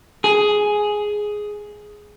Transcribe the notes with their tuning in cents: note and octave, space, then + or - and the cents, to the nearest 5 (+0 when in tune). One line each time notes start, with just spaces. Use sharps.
G#4 +5